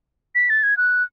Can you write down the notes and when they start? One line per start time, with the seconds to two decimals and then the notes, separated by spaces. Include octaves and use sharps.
0.35 B6
0.50 A6
0.63 G#6
0.77 F#6